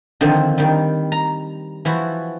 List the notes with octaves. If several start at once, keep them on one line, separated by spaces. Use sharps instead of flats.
D3 D#3 F3 C4
D#3 G3
A#5
E3 F3 E4 F#4